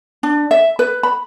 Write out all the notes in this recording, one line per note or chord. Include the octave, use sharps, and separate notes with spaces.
D4
E5
B4
B5